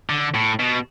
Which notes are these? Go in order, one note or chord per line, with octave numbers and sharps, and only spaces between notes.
D3
A2
B2